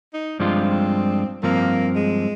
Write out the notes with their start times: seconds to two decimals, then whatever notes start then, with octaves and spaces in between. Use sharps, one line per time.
0.14 D#4
0.39 G2 F3 G#3 C4 D4 F4
1.43 G2 F3 A#3 C4
1.95 G#3